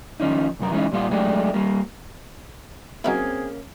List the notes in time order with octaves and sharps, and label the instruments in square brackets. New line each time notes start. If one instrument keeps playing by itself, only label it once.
[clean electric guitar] D#3 F3 C#4 D#4
C2 F#2 B3 A#4
E3 G#3 C#4 D#4
A#2 G3 B3 F4
F#3 G#3 A3 D4 G4
G3 A#3
[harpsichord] F#3 D#4 E4 [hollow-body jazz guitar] A#3 C#4 [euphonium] C4 [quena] G#4